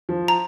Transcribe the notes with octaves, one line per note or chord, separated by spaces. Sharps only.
F3
A#5